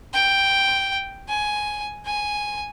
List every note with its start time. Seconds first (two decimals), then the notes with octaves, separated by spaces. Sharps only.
0.13 G5
1.29 G#5
2.06 G#5